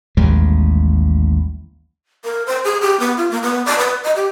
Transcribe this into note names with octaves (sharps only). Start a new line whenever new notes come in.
A1 D#2 G3 G#3
A#4
C5
G#4
G4
B3
F4
A#3
B3
D5
B4
D#5
G4